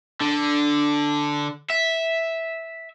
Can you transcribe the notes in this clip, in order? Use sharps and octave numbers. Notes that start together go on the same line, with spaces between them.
D3
E5